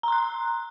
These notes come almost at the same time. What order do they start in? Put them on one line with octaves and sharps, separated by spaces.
A#5 C6 F#6